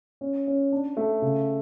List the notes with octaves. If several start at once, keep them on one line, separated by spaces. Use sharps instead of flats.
C#4
C#4
D4
A3
C#3